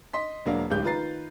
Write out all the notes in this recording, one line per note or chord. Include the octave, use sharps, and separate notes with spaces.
D#5 C6 B6
E1 F#3 A#3 D4 F5
D1 C#2 G#3 D#4 G4 G6
D#3 F4 B4 A#5 A6 C7